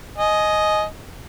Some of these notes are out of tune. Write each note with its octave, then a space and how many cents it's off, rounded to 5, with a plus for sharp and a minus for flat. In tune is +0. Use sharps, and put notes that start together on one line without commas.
D#5 +0 G#5 +25